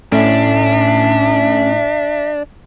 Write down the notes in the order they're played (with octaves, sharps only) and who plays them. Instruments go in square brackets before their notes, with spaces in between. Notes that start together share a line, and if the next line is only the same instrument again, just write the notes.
[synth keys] A2 [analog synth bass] C#4 [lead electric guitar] D4 [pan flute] E5